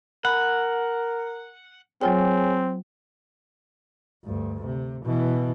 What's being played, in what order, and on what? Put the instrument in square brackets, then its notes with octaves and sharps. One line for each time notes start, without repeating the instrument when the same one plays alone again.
[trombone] A#4 [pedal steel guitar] F#5 [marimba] B5
[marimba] F#3 F4 G5 [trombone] C4 [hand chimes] G#4 C#5 G#5
[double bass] D2 G2
C3
B2 E3